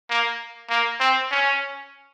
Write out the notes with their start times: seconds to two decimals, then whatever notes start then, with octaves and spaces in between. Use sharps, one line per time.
0.10 A#3
0.70 A#3
1.00 C4
1.31 C#4